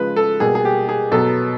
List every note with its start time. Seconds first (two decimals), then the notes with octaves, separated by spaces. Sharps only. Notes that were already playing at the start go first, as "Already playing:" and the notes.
Already playing: C#3 F3 G#3 B4
0.16 A4
0.40 B2 G3 A#3 G#4
0.55 G#4
0.65 G4
0.89 G#4
1.12 B2 F#3 B3 A4